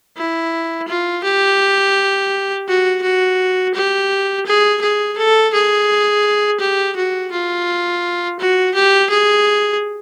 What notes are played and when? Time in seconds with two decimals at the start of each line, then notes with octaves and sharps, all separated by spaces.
0.17 E4
0.88 F4
1.24 G4
2.68 F#4
3.03 F#4
3.75 G4
4.46 G#4
4.81 G#4
5.18 A4
5.54 G#4
6.60 G4
6.96 F#4
7.32 F4
8.40 F#4
8.75 G4
9.10 G#4